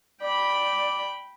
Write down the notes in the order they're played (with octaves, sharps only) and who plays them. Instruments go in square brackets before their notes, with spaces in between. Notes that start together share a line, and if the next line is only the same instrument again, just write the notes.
[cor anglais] D5 [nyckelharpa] G5 B5